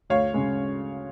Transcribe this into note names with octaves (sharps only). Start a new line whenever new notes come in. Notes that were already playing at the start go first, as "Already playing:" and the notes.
D2 C#5 F5
C#3 G#3